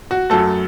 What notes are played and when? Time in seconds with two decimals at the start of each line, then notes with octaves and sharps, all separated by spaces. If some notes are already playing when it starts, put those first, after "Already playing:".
0.11 F#4
0.30 F#2 F#3 A3 A4